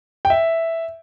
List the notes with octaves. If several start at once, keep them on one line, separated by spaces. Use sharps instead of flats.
G5
E5